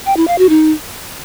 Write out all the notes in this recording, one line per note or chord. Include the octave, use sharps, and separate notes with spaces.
G5
E4
F5
F#4
D#4